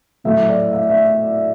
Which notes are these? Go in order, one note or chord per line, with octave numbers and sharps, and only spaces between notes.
A2 F#3 A3 E5
D5
E5
E5